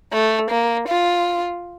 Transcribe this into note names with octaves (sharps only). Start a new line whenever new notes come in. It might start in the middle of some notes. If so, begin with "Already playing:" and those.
A3
A#3
F4